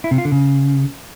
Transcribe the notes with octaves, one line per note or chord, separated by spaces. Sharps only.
E4
C3
F4
D3
C#3